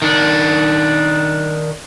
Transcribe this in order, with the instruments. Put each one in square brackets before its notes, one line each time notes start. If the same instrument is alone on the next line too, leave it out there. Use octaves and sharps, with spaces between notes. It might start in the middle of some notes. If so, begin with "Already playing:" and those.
[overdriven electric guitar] D#3 D4